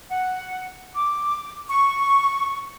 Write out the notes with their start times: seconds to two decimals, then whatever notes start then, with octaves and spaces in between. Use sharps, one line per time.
0.09 F#5
0.95 D6
1.69 C#6